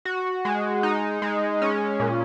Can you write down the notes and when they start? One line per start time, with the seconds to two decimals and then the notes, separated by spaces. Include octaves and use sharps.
0.05 F#4
0.45 G#3
0.83 D#4
1.22 G#3
1.62 C#4
2.00 A#2